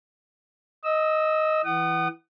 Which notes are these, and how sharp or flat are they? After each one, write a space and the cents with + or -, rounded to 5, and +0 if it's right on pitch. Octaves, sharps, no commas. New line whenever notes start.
D#5 +5 E6 -20
E3 +0 F#5 +30 D#6 -25